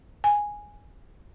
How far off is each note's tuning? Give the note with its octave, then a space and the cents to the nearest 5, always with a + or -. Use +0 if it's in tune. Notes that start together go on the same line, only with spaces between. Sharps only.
G#5 -5